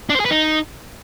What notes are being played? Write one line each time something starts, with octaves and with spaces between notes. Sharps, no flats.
D4
C5
G#4
B4
D#4